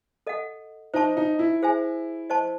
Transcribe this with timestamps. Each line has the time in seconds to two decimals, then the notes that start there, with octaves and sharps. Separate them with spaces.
0.27 A4 D#5 F#5
0.94 D#4 C5 E5 A5 C#6
1.17 D#4
1.39 E4
1.62 G#4 C5 E5 G#5
2.30 C5 D#5 A5 C#6